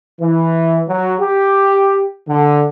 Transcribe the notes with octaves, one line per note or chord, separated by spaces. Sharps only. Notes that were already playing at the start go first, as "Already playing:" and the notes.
E3
F#3
G4
D3